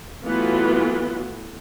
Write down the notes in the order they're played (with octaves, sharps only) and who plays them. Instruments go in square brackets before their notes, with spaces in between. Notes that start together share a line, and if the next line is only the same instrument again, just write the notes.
[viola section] E3 F#3 A3 B3 F4 F#4